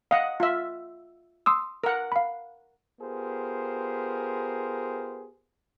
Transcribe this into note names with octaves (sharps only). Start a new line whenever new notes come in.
D#5 F5 F#5
F4 E5
C6 D#6 E6
A#4 F#5
F5 B5
B3 F4 G4 G#4 A#4 C5